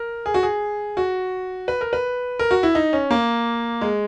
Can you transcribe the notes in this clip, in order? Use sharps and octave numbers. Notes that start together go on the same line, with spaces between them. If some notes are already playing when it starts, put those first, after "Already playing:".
Already playing: A#4
G#4
F#4
G#4
F#4
B4
A#4
B4
A#4
F#4
E4
D#4
C#4
A#3
G#3